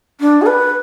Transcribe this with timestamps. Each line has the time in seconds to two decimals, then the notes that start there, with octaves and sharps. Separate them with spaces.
0.20 D4
0.41 G#4
0.46 B4